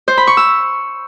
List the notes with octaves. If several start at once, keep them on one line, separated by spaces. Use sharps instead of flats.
C5
B5
C#6
E6